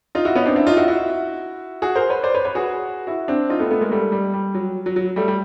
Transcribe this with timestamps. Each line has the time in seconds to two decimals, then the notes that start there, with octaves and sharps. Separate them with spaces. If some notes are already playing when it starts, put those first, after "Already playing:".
0.15 D#4 F4
0.25 E4 F#4
0.35 B3 C#4
0.42 D#4
0.46 C4 D4
0.56 D4 E4
0.67 D#4 F4
0.77 E4 F#4
0.88 E4 F#4
1.82 F#4 G#4
1.95 A#4 C5
2.10 B4 C#5
2.23 C5 D5
2.34 B4 C#5
2.44 B4 C#5
2.55 F#4 G#4
3.07 E4 F#4
3.28 C4 D4
3.49 D#4 F4
3.59 A3 B3
3.70 A3 B3
3.81 G#3 A#3
3.92 G3 A3
4.12 G3
4.34 G3
4.54 F#3
4.86 F#3
4.96 F#3
5.16 G3 A3
5.28 G3